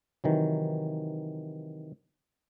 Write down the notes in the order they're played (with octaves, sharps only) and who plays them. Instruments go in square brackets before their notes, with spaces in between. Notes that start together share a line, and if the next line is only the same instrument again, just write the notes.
[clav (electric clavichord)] C3 D#3 E3 F#3